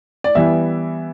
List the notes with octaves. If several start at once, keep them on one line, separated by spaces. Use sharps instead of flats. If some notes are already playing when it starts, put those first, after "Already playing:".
D5
E3 G3 B3 E5